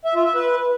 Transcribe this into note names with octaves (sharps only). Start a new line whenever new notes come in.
E5
F4
E5
B4